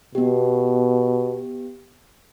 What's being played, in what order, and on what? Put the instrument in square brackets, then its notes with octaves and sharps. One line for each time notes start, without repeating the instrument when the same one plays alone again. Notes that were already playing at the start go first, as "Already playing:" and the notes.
[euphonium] B2 [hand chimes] B3 G4